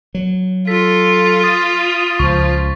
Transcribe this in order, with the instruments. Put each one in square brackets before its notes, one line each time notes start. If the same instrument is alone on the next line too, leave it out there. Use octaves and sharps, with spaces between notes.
[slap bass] F#3
[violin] F4 [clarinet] A4 [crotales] B6
[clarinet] D#6 [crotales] A6
[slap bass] C#2 [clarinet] F3 [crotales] C#6